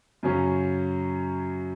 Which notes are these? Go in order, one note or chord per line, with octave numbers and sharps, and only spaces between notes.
F#2 C#3 F#3 C#4